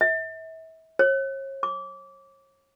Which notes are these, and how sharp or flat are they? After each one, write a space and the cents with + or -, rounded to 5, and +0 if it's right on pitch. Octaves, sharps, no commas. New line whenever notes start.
E5 -35
C#5 -40
D6 -25